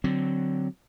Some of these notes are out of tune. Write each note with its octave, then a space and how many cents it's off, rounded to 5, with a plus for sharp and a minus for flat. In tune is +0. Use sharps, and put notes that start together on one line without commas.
D3 +0 F#3 +0 C4 -10